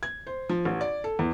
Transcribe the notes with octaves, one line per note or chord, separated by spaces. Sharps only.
G#6
C5
F3
A1
D5
A4
E2